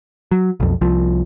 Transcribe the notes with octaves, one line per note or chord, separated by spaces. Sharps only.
F#3
B1 F2
C2 F3